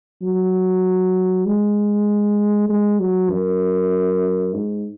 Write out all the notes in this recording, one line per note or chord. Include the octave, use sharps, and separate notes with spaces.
F#3
G#3
G#3
F#3
F#2
G#2